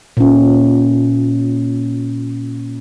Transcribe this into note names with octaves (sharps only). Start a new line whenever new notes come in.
A#2 C#4